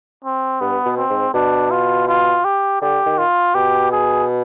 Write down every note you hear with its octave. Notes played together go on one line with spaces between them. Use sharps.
C4
G2 B3
B2
C4
G#2
B2 D4
F4
F4
G4
D3 G4
D#3
F4
B2 G4
G#4